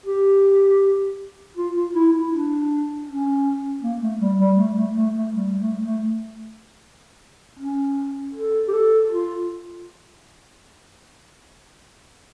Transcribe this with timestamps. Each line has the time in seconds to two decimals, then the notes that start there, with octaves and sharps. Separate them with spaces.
0.06 G4
1.57 F4
1.75 F4
1.94 E4
2.13 E4
2.32 D4
3.08 C#4
3.82 A#3
4.02 A3
4.20 G3
4.39 G3
4.57 A3
4.77 A3
4.96 A3
5.14 A3
5.34 G3
5.59 A3
5.83 A3
7.59 C#4
8.35 A4
8.68 G4
8.73 A4
9.10 F4